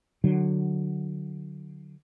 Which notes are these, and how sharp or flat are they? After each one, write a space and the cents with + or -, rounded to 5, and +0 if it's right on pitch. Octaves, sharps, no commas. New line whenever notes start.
D3 +20 F#3 +0